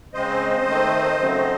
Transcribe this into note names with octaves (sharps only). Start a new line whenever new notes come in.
C#3 G#3 C4 C5 D#5
D#3 A3 C4
C#3 F#3 A3 C4